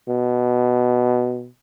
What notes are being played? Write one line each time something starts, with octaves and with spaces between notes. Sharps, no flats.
B2